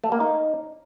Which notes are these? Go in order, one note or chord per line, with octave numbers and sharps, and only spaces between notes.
A3
A#3
D#4